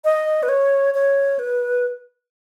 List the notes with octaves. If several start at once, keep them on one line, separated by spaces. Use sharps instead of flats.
D#5
B4
C#5
C#5
B4